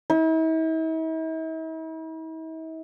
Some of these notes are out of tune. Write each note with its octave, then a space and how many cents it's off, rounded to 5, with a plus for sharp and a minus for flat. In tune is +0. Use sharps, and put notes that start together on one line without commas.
E4 -45